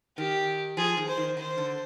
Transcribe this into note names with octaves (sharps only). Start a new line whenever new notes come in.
D#3 G4
F3 G#4
D#3
C5
D#3
D#3 C5
D3